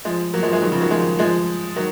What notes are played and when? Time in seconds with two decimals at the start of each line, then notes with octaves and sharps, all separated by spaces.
0.05 F3 G#3
0.34 F#3 A#3
0.43 F3 G#3
0.53 F3 G#3
0.62 D#3 F#3
0.71 C#3 F3
0.81 D#3 F#3
0.90 F3 G#3
1.19 F3 G#3
1.76 D#3 F#3